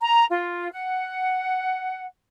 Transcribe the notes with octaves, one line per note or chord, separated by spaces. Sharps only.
A#5
F4
F#5